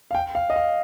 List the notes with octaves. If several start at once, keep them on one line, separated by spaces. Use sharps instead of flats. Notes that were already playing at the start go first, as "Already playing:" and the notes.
F5
G5
F5
D#5
F5